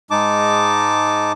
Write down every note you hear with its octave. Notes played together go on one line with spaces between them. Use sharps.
G#2 G#3 D#4 A5 D6